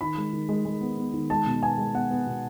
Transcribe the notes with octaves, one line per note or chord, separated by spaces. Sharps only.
D#3 B5
G#3
D#3
G#3
G#3
B3
B3
D#3
G#3 A5
B2
B3 G#5
G#3
B3 F#5
B3
B2